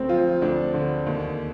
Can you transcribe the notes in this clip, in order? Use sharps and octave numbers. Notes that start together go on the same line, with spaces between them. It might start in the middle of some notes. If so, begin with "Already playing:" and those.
Already playing: D2 C4
F3 F4
D2 D4
D3
D#2